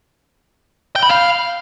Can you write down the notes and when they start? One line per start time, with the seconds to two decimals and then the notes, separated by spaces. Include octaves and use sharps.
0.96 G5
1.03 B5
1.09 F5